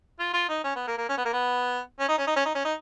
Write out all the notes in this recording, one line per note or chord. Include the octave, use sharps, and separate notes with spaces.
F4
F4
D#4
C#4
B3
A#3
A#3
C#4
B3
A#3
B3
C#4
D#4
C#4
D#4
C#4
D#4
C#4
D#4